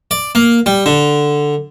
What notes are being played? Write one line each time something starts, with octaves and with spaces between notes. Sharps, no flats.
D5
A#3
G3
D3